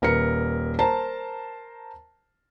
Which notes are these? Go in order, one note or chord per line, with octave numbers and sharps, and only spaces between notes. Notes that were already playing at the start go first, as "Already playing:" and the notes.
D#1 A#4 B4 C#7
A#4 C5 A5 A#5